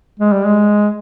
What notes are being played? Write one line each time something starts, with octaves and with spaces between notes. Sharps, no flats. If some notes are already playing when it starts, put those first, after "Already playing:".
G#3
G3
G#3